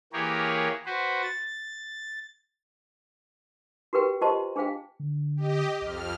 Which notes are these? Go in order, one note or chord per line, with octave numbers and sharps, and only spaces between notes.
E3 A#3 G4 G#4 A#4 C#5
F#4 B4 C5
A6
F#4 G4 A#4 B4 G5
F4 G4 C5 D#5 A5 C6
D4 G#4 C5 F5 G5
D3
G4 D#5
C2 F2 F6